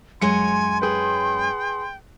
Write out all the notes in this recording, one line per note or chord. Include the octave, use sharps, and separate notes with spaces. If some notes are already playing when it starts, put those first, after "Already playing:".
F#2 G#3 C#5 G#5 C6 C#7
G#4 B4 G5